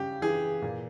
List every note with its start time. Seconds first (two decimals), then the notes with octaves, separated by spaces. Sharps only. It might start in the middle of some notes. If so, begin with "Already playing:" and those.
Already playing: C#3 G3 G4
0.22 E3 G#4
0.62 A#2